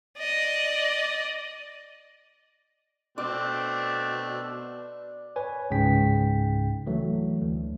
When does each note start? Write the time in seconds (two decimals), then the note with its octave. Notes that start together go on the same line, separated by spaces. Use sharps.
0.18 D5 D#5
3.18 B2 A3 C4 D4 D5
5.36 B4 C#5 G#5
5.70 C#2 G#2 C#3 G5 B6
6.86 E3 F#3 A3
7.41 D2